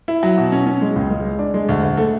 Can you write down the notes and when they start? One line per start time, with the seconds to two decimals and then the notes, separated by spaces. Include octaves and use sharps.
0.08 E4
0.23 F#3
0.38 B2
0.52 C#4
0.67 C#4
0.81 G#3
0.96 C#2
1.10 G#3
1.25 G#3
1.39 D4
1.54 G#3
1.69 D2
1.83 D2
1.97 A3